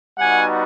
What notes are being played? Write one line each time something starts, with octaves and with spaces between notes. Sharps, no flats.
G3 B3 D#4 F#4 F#5 G#5